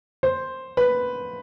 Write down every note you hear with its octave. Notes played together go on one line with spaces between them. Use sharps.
C5
B4